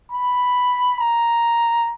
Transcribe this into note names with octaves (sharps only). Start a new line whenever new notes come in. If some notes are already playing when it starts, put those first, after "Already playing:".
B5
A#5